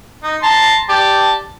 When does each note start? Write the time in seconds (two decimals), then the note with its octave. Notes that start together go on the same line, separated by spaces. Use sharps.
0.24 D#4
0.43 A5 A#5 C6
0.89 G4 D5 A5